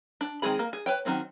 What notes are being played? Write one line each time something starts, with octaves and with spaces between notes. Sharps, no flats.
D4
D#3 G#3 C4 G#4 B5
A#3
G#4
B4 C#5 G5
D#3 F#3 C4 C#4